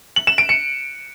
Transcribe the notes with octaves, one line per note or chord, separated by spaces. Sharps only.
F#7
E7
D7
C#7